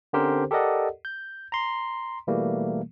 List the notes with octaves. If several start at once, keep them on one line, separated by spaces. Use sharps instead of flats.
D3 C4 C#4 G4 A#4 C5
G4 A4 A#4 D5 D#5 F#5
G6
A#5 C6
B2 E3 G3 A3 A#3